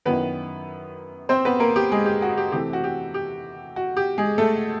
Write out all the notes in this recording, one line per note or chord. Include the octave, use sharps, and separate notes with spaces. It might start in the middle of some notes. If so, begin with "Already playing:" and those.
F#2 D#3 F#3 B3 E4 B4
C4 C5
B3 B4
A#3 A#4
G4
G#3 G#4
G4
F#4
G4
C3 E3 A3 C4 G4
F#4
G4
G4
F#4
G4
G#3 G#4
A3 A4